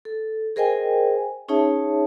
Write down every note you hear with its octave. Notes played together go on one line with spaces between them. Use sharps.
A4
G#4 A#4 C5 D#5 G5 G#5
C#4 D#4 G#4 C#5 E5 A5